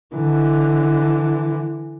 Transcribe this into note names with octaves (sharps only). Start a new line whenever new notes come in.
D3 E3